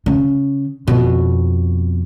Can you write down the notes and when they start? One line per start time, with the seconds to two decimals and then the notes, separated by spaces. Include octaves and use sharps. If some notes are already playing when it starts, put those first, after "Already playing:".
0.06 C#3
0.87 F2 B2